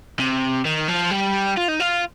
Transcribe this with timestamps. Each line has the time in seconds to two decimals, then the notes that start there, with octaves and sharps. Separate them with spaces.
0.19 C3
0.65 D#3
0.88 F3
1.11 G3
1.57 F4
1.68 D#4
1.80 F4